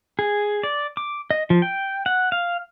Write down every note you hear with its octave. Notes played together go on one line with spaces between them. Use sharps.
G#4
D5
D6
D#5
F3
G5
F#5
F5